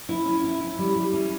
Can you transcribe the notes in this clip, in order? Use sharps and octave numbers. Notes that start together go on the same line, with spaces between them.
E4
C#4
E4
E4
G3
G3
C#4